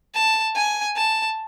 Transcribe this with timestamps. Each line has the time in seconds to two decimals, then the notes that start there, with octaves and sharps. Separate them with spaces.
0.14 A5
0.56 G#5
0.96 A5